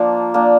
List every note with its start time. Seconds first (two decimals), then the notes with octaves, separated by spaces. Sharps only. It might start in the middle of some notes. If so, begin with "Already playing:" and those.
Already playing: F3 A#3 D4
0.34 A#3 D4